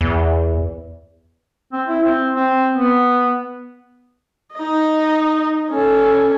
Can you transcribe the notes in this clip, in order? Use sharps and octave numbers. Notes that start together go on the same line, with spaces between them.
E2
C4
E4
C4
C4
B3
D#4 D#5
C#4 A4